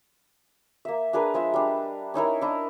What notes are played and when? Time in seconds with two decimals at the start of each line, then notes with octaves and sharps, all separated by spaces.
0.85 A#3 E5
1.13 D4 G#4 A#4 B4
1.34 F3 G#3 E5 E6
1.54 G3 D4
2.14 C#4 D#4 E4 A#4
2.41 D4 E4 D#5